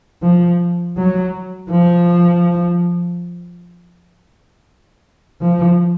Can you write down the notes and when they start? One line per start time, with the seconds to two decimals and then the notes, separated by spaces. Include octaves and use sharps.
0.22 F3
0.97 F#3
1.70 F3
5.41 F3